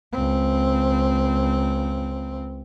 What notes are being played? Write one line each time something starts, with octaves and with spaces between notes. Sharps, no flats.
C#2 C4